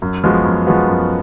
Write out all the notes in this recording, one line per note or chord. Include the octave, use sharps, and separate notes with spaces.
F#2
F3 G#3 B3 F#4
F#2
F3 G#3 B3 F#4
F#2